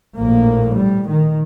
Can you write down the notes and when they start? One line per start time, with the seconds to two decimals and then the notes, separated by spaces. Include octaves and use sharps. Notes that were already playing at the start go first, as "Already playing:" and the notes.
0.17 A#1 A2 A#3
0.78 G3
1.09 D#3